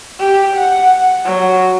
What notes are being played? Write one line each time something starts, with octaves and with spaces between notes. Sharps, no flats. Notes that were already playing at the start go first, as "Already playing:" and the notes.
G4
F#5
F#3